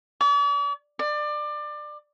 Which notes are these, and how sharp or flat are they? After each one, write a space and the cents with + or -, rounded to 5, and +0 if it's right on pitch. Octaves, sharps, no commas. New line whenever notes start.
D5 -45
D5 +25